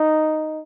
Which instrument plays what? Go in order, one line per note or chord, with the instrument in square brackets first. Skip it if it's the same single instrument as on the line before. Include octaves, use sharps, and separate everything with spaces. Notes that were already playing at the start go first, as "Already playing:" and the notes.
Already playing: [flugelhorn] D#4